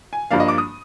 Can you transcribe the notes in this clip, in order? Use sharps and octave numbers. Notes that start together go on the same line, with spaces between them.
G#5
G2 F3 A#3 D4 F5
D#5
D6
D#6